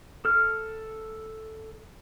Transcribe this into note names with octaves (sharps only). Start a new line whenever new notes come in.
A4 F6